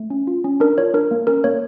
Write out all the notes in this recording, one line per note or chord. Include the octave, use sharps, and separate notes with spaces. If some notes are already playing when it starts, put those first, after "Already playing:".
Already playing: A3
C#4
F4
C#4
D4 A#4
F4 C#5
D4 A#4
A#3
C#4 A#4
A#3 C#5